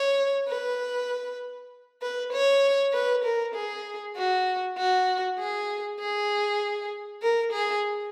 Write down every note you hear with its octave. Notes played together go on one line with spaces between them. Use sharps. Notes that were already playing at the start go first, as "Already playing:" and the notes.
Already playing: C#5
B4
B4
C#5
B4
A#4
G#4
F#4
F#4
G#4
G#4
A#4
G#4